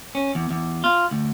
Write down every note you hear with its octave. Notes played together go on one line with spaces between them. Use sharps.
C#4
E2
E2
F4
D2